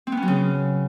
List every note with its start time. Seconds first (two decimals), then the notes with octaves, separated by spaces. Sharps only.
0.07 C4
0.12 B3
0.17 C#4
0.23 F#3
0.28 C#3